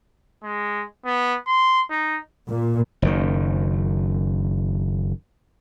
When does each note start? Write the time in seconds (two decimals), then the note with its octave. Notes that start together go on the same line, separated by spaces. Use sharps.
0.44 G#3
1.05 B3
1.47 C6
1.90 D#4
2.49 A#2
3.02 F#1 F#2 D#3